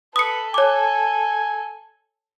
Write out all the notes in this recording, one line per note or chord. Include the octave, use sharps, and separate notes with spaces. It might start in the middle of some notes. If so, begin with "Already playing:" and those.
A4 B4 D#6 C#7
C#5 G#5 D6